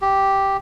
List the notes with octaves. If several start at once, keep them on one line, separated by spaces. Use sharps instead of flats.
G4